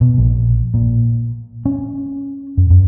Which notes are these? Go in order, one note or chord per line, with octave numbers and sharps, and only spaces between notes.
B2
A#1
A#2
C#4
F#2
F#2